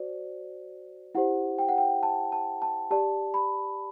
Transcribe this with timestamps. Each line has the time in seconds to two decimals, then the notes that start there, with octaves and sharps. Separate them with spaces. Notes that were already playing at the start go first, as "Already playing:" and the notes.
Already playing: F#4 C5 D5
1.15 E4 G4 C5 F#5
1.59 G5
1.69 F#5
1.78 G5
2.03 A5
2.32 A5
2.62 A5
2.91 G4 D5 A5
3.34 B5